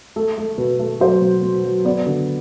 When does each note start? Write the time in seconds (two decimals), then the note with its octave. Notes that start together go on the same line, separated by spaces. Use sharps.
0.16 A3 A4
0.38 A3
0.58 B2 B4
0.79 A3
1.00 F#3 C5
1.22 B2
1.42 B2
1.64 F#3
1.85 B3 D5
2.07 D3